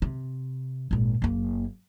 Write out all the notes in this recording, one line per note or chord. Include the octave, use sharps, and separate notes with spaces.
C3
G#1 A#2
F#1 A#3